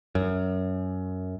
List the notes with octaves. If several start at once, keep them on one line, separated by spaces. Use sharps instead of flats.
F#2